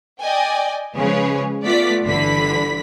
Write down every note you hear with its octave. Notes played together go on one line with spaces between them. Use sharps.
D5 D#5 G5 G#5
C#3 F3 G#3 G#4 B4 C#5
A3 B3 F4 D5 B6
G1 D3 E3 B5 B6